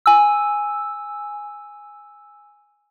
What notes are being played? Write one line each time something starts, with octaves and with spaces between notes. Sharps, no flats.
G#5 E6